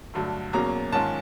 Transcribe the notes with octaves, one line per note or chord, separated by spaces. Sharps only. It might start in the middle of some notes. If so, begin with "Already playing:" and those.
G2 D3 F#3 A3
E2 B2 F#3 A#3 C#4 A#5
G#2 D#3 G#3 C#4 F4 A5